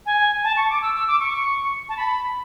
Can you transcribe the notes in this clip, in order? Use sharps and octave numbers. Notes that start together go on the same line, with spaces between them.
G#5
A5
C#6
D6
E6
E6
D6
C#6
A5
B5